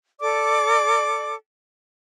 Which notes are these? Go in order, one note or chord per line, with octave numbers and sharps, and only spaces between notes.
A4 D5 D6